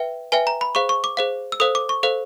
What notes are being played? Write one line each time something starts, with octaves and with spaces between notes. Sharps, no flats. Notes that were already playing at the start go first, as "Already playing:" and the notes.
Already playing: B4 E5 G5
B4 E5 G5 G#5
A#5
B5
G#4 C5 F5 C#6
C#6
D6
G#4 C5 F5
E6
A4 C5 F5 D#6
D6
C#6
A4 C5 F5